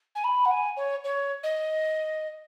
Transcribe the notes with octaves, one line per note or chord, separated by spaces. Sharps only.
G#5
B5
F#5
G#5
C#5
C#5
D#5